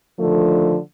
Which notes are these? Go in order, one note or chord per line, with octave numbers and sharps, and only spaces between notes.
D3 D#3 F3 A3